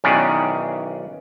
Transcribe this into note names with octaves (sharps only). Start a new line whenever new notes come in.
B1 D#3 E3 C#4 G#4 D5